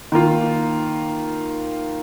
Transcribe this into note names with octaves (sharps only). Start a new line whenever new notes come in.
D#3 A#3 F4